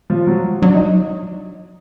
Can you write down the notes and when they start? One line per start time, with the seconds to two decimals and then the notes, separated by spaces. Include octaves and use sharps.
0.10 F3
0.27 F#3
0.62 F#3 D4
0.74 D#4